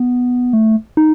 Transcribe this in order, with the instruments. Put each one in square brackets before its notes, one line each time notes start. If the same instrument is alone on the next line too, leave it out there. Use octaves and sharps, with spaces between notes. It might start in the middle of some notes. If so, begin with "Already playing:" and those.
Already playing: [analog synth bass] B3
A3
D#4